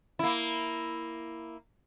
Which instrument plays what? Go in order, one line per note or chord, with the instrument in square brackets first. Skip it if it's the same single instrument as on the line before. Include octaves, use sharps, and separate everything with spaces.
[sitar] A#3 E4